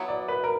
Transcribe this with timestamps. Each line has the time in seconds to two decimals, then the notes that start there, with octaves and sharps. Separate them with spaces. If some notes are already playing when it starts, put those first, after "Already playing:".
Already playing: F#3 B3 E4
0.09 D5
0.28 B4
0.44 A#4